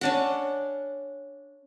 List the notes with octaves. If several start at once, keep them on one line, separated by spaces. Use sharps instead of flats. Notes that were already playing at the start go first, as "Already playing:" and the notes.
C#4 D4 F#5